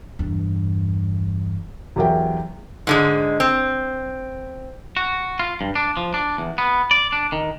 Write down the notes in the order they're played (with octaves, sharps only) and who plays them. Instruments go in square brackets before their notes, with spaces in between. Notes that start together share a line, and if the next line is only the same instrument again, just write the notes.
[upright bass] E2 G2
[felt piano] E2 F#3 G4 A#4 E5 G5
[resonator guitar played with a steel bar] G#2 D3 G#3
C4
[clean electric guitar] F#4
F4
G2
D4
F3
D4
E2
B3
D5
D4
D#3